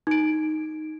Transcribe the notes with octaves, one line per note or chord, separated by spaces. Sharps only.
D#4 D7